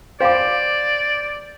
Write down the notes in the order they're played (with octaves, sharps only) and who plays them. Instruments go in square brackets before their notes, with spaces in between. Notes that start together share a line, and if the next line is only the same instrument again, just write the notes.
[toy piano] F4 F5 G5 [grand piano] C5 D6 [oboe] D5